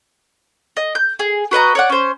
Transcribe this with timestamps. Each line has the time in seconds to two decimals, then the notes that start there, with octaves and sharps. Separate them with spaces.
0.77 D#5
0.95 G6
1.19 G#4
1.51 F#4 B4 D#5 A#5
1.75 C#5 D5 F#5
1.90 C#4 C5